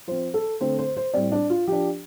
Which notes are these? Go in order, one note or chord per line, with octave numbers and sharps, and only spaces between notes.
F3 C4 C5
A4
D3 A3 C4 C5
C5
C5
A2 G3 C4 D5
D4
F4
F3 D4 G4